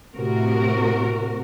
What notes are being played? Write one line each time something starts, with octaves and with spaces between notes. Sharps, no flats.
A2 C3 F#4 A#4